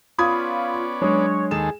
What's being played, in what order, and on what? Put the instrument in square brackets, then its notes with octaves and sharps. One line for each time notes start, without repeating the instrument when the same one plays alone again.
[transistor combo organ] B3 C#4 D5 [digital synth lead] F4 [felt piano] B5 D#6 G#6
[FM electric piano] F#3 D4 [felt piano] G#3 [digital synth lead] C#5
[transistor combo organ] D#2 G#3 A4 [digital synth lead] G#4 [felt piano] E7